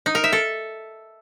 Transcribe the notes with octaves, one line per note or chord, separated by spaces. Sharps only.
D#4
A#4
E5
A4